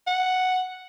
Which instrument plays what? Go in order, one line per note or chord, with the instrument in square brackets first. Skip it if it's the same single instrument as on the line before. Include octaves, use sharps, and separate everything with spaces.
[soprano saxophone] F#5